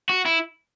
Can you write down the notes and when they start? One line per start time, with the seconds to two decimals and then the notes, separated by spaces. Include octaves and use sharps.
0.09 F#4
0.26 E4